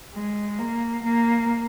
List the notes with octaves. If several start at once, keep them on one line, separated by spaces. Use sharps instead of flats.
G#3
A#3
A#3